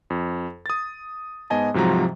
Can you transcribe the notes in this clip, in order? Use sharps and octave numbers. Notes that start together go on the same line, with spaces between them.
F2
D#6 A6
G#2 B3 D#5 G#5 A5
G#2 C3 F3 F#3 A#5